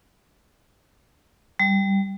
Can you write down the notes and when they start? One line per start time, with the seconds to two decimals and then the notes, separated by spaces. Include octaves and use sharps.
1.60 G3